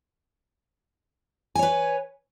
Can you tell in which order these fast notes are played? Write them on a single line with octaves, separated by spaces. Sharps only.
G#5 C#5 B4